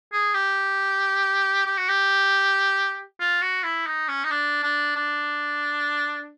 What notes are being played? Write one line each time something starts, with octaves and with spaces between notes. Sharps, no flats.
G#4
G4
G4
F#4
G4
F4
F#4
E4
D#4
C#4
D#4
D4
D4
D4